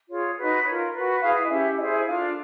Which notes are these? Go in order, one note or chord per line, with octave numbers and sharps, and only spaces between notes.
F4 G#4 C#5
D#4 F#4 B4
F4 A#4 C#5
F#4 B4
E4 G#4 B4 F5
D#5
C#4 E4 G4 E5
E4 G#4 C5 D#5
E5
D4 F4 A4 F5